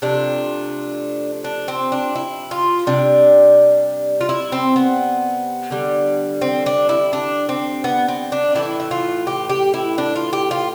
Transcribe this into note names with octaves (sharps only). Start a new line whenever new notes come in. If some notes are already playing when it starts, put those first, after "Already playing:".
C3 F3 A3 D4
D4
C4
D4
E4
F4
C3 G3 D4
F4
E4
C4
B3
D3 G3
C4
D4
E4
D4
C4
B3
C4
D4
A2 E3 A3 E4
E4
F4
G4
G4
E4
D4
F4
G4
F4